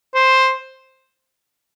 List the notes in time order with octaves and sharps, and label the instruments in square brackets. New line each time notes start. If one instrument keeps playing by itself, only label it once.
[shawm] C5